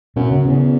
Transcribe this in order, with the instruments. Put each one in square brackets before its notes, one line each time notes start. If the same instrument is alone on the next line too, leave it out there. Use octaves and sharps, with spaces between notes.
[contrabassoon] F#2 [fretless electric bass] B2
[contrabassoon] F#2 [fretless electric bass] C#3
[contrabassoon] E2 [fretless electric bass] C#3